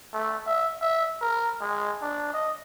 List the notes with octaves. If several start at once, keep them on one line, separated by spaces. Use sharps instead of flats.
A3
E5
E5
A#4
G#3
D4
D#5